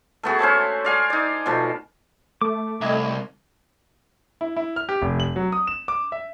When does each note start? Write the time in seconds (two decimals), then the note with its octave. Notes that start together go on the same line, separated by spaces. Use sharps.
0.23 A3 B3 F#4 G#4
0.39 C#4 C5 E5 A5
0.85 D5 F5 G#5
1.10 D#4 D5
1.46 B2 F3 A3
2.41 A3 D6
2.81 C2 D#5 E5 G#6
4.41 E4
4.57 E4
4.76 F6
4.89 G4
5.02 F1
5.20 F#7
5.36 F#3
5.52 D#6
5.67 E7
5.88 D6
6.12 E5